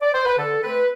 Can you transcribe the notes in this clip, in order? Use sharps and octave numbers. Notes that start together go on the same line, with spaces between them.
D5
C5
B4
D3 A4
A3 C4 B4